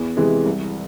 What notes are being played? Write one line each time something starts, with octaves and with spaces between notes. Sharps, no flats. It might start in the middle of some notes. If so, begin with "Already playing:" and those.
Already playing: E2
C3 E3 G#3
C2